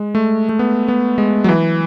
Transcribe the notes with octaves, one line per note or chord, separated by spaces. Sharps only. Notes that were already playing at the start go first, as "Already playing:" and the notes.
Already playing: G#3
A3
A3
B3
B3
G#3
F#3
E3